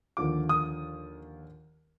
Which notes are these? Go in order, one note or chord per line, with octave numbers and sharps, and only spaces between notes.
D#2 D3 F3 D6
D#6